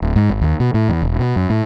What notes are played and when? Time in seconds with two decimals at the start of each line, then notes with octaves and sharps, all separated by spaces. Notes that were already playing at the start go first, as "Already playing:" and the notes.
0.02 D1
0.16 G#2
0.30 G#1
0.41 D#2
0.60 B2
0.74 A2
0.88 E2
1.02 E1
1.19 B2
1.36 F#2
1.50 A2